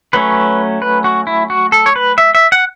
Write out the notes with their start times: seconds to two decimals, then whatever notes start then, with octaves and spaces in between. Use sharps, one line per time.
0.13 F#3 A3 C#4 B4
0.82 B4
1.04 F#4
1.27 E4
1.50 F#4
1.72 A4
1.86 C#5
1.96 B4
2.18 E5
2.35 E5
2.52 F#5